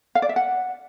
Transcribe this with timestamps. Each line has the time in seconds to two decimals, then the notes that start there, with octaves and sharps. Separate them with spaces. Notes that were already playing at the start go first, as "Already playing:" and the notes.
0.15 F5
0.22 D5
0.29 E5
0.36 F#5